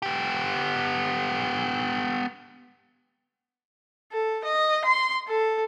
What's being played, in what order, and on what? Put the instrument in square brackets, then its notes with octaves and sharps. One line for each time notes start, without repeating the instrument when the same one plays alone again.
[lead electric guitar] B3 G4
[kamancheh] A4
D#5
C6
A4